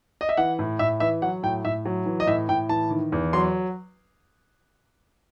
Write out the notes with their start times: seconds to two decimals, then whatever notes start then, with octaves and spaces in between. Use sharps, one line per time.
0.21 D#5
0.29 E5
0.37 E3 F#5
0.59 A2
0.79 A2 E5
1.00 E3 E5
1.22 F#3 F#5
1.43 A2 G5
1.65 A2 E5
1.85 F#3
2.06 E3
2.20 D#5
2.27 A2 E5
2.49 A2 G5
2.69 E3 A5
2.90 D#3
3.12 E2
3.33 F#3 C6